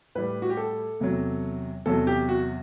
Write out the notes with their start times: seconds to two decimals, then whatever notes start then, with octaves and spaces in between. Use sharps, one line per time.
0.15 A2 G3 B4
0.42 F#4
0.50 G4
0.57 A4
1.00 E2 C3 F#3
1.86 E2 C3 F#3 A4
2.07 G4
2.29 F#4